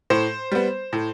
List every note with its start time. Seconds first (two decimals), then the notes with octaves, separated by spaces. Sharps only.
0.10 A2 C5
0.52 G3 B3
0.93 A2